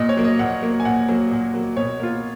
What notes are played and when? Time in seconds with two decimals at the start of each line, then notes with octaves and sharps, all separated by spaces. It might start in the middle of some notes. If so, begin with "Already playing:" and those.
Already playing: A#2 D#5
0.09 C#5
0.17 F#3 A#3
0.24 D#5
0.39 A#2 F#5
0.62 F#3 A#3
0.80 G#5
0.85 A#2 F#5
1.08 F#3 A#3
1.31 A#2
1.54 F#3 A#3
1.76 B2 C#5
2.00 A#3 F4